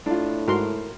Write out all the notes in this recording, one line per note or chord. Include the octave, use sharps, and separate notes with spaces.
A2 D4 F4
G#2 F#4 A#4 C6